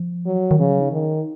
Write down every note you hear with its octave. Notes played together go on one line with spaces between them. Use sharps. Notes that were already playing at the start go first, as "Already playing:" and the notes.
Already playing: F3
F#3
D#3
C#3 F3
F#3
D#4
D#3